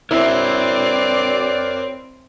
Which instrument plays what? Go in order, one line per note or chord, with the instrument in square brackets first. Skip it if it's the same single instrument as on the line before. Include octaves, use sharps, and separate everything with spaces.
[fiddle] C4 [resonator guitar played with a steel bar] E4 [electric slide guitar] A#4 C#5 [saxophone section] D5